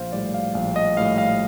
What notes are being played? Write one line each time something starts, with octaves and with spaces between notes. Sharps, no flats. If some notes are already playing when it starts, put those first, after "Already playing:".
Already playing: A#1 C5 F5
A2 G3 D5
F5
A#1 F5
D#5
A2 G3 F5
F5